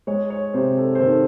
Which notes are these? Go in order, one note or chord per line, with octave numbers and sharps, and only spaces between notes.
G#3 C#5
C#5
C3 C5
A4
C5
D#3 A4